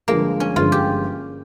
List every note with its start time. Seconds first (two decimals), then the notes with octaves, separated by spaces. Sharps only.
0.08 G1 G2 F3 G#3 A#3
0.40 C#4
0.56 G1 G2 F3 G#3 F4
0.72 G4